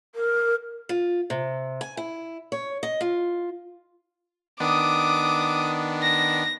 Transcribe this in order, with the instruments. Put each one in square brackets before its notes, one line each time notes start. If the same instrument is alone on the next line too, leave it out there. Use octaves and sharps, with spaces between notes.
[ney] A#4
[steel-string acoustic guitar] F4
C3
G#5
E4
C#5
D#5
F4
[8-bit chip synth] D#3 B3 D4 [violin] D6 D#6
[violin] A#6